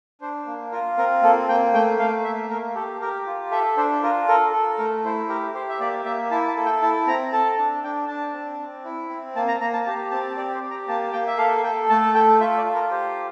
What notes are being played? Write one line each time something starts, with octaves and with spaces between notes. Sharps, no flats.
D4 C5
A#3
F4 A#4
C4 A#4
A#3 A4
A#3 G5
A3 G5
A3 F5
A#3 E5
A#3 A#4
G4 A4
G4 A#4
F4
A4 E5
D4 C5
F4 A#4
A4 A#4
A4
A3 A#4
E4 C5
G4 A#4
G4 C5
E5
A#3 D5
A#3 E5
E4 A5
A5
A4
G5
E4 A5
C4 A#5
A4 A5
D4
D4 G5
D4 A5
C4
C4
E4
C4
A#3 A5
A#5
A#3 A#5
A5
G4 A5
C4 A5
G4 D5
C5
G4
A#5
A#3 A5
A#3 G5
E5
A4 F5
A4 G5
A3 A5
A4 G5
F4 E5
D5
F4
A#4
G4 C5